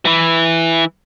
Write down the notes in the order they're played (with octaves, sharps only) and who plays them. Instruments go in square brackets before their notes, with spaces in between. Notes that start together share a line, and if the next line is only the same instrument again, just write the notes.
[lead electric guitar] E3 E4